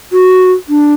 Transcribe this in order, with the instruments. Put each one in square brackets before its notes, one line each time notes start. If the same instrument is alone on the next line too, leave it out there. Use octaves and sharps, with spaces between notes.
[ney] F#4
D4